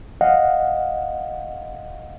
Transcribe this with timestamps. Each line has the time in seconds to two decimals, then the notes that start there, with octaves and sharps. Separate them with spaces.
0.21 D#5 F5 F#5